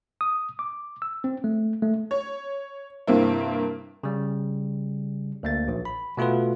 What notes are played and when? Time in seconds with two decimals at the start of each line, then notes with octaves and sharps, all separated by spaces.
0.21 D#6
0.59 D6
1.02 E6
1.24 C4
1.44 A3
1.82 A3
2.11 C#5
3.07 G2 C3 A#3 C4 E4
4.03 C#3 G3
5.43 D2 A#3 A6
5.68 A#1
5.85 B5
6.17 B2 A3 F4 F#4 B4